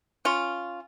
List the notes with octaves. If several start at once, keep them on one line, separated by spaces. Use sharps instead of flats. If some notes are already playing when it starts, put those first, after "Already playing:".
C#4 F4